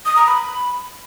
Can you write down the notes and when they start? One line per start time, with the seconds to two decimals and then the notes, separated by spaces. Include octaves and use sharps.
0.05 D#6
0.16 A#5
0.26 B5